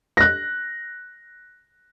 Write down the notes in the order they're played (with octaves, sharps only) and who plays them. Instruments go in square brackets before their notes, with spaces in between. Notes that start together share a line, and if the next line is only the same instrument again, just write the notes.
[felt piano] F#6 A#6